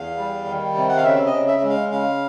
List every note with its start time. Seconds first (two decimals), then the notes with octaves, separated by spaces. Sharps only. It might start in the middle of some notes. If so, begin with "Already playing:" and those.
Already playing: E2 F5
0.17 G3
0.45 D#3
0.75 C3
0.89 F#5
0.97 F5
1.04 C#3 E5
1.26 D#5
1.33 C#3
1.47 E5
1.62 G#3
1.70 F5
1.91 C#3 F5